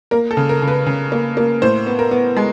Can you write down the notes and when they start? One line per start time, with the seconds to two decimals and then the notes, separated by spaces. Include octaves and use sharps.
0.11 A#3 A#4
0.31 A4
0.37 C#3
0.49 A#4
0.62 C#3
0.68 B4
0.86 C#3
1.12 A#3
1.37 A#3
1.62 A2 C5
1.87 B3
1.99 A#4
2.11 B3
2.37 G#3